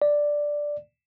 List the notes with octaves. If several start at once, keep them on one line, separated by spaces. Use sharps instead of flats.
D5